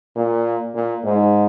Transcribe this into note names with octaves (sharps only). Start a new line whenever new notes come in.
A#2
A#2
G#2